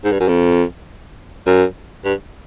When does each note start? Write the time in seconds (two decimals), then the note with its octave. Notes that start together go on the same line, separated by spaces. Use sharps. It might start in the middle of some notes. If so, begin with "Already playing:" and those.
0.04 G#2
0.12 G2
0.20 F#2
0.28 F2
1.46 F#2
2.05 G2